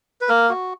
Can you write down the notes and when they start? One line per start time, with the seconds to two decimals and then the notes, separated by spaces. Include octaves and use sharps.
0.21 B4
0.29 A#3 A#4
0.49 F#4